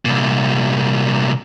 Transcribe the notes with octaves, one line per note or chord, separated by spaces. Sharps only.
C2 A#2